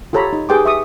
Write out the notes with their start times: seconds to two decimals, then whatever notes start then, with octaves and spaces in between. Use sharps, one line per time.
0.13 F4 G4 A4 C#5 A#5 B5
0.33 D#4
0.49 G4 G#4 B4 G5 C6 D6
0.65 E5 C#6 D#6